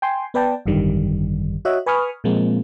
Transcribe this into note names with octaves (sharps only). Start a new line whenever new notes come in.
G5 G#5 C6
B3 B4 D5 G5 A5
G#1 F#2 D3 D#3 G3
F#4 C#5 D#5 E5 F#6
B4 G#5 B5 C#6 D#6 F6
A#2 F3 G#3 A#3 C4